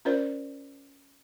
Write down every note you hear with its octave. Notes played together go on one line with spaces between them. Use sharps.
C#4 F4 A#4 C5 D5